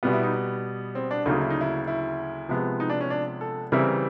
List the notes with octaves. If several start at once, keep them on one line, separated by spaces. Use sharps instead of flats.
B2 G3 B3 F4
E4
D#4
C4
D4
D2 C#3 F#3 A#3 D#4
E4
D#4
E4
E4
C3 F3 G#3 B3
D#4
D4
C#4
D4
A4
C#3 E3 G3 C4 E4 A#4